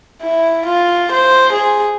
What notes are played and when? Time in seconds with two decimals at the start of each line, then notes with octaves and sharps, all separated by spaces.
0.23 E4
0.65 F4
1.11 C5
1.52 G#4